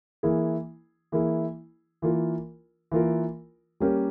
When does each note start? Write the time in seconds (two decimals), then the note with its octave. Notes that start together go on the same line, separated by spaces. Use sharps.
0.23 E3 A#3 E4 G#4
1.12 E3 A#3 E4 G#4
2.02 E3 A#3 F4 A#4
2.92 E3 A#3 F4 A#4
3.80 G3 A#3 C#4 G4 A#4